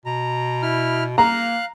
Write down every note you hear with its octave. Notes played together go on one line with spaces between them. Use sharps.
B2 A#5
E4 F6
A#3 F5 A#5 F#6